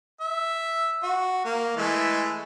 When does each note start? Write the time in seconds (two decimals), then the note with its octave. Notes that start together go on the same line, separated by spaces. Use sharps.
0.20 E5
1.03 F#4
1.45 A#3
1.77 E3 G#3 A3